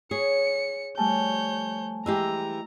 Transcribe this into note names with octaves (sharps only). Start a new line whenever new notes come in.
G#4 C#5 C#7
F3 G3 A3 C#5 G#5 A5 G6
E3 G#3 G4 A#5 E6